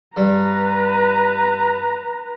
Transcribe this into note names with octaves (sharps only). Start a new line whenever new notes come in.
G2 G3 B4 A#5